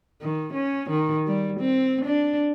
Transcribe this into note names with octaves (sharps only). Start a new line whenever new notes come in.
D#3
C#4
D#3
G3
C4
D4